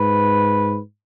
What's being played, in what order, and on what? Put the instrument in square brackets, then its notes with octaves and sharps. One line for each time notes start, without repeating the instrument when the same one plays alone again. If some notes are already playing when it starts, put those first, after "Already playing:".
Already playing: [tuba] G#2 [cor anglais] B4